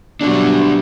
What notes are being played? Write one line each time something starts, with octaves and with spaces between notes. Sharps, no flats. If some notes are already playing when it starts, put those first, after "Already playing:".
B2 F#3 G3 D4 F#4 A4